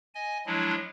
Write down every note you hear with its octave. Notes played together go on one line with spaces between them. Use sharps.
D#5 G#5
F3 F#3 G#3 D4 E4